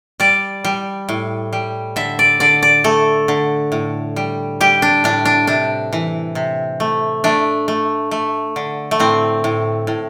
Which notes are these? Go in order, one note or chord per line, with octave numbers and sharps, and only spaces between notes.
G3 D5
G3
A2
G3
D3 E5
D5
D3 D5
D5
A3 A4
D3
A2
G3
G3 G4
D4
A2 D4
D4
C3 D4
E3
C3
A3
A3 D4
A3
A3
D3
A3
A2 C4
A2
A2